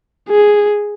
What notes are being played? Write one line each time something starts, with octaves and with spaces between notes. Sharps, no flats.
G#4